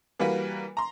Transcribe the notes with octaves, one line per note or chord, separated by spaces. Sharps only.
E3 G3 A#3 F#4 A#4 B4
A#5 C6